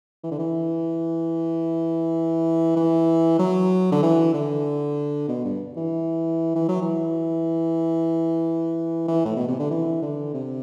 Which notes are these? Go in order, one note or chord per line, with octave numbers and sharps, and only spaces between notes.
E3
D3
E3
E3
F#3
D3
E3
D3
B2
G2
E3
E3
F#3
E3
E3
A2
B2
C3
D3
E3
D3
C3